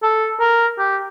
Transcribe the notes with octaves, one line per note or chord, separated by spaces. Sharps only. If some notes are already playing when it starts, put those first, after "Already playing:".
A4
A#4
G4